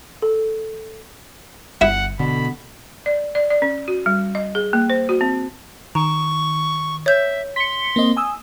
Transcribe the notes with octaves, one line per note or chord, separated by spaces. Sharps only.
A4
G1 E4 E5 F#5
B2 D3 B5
D5
D5
D5
C#4
F#4
G3
D#5
G#4
A#3
C5
F#4
C4
D#3 A#5 C#6
C#5 E5 G6
C6 B6 C#7
A#3 C4 D#5
G#5 D#6 E6